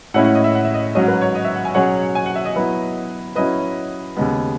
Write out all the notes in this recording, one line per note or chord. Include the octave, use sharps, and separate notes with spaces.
A2 G#3 C#4 E4 F#5
F#5
D#5
E5
F#5
E5
D#5
G#2 F#3 C#4 D#5
B4
C#5
D#5
E5
F#5
G#5
B2 F#3 C#4 G#4 C#5 F#5
G#5
F#5
E5
D#5
F#3 B3 E4 B4
F#3 C#4 E4 B4 D#5
D#2 C#3 G#3 B3